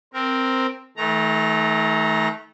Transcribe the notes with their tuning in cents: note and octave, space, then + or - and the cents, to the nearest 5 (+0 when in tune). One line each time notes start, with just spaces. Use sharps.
C4 +0 A#4 +0
D#3 +40 A3 -20 A#5 +0